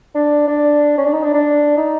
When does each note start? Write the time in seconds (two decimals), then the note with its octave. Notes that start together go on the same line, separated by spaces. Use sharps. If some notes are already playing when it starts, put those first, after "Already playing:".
0.15 D4
0.48 D4
0.98 C#4
1.05 D4
1.13 D#4
1.23 D4
1.34 D4
1.77 D#4